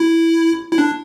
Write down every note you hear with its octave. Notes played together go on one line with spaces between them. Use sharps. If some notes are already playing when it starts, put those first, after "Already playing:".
Already playing: E4
E4
D4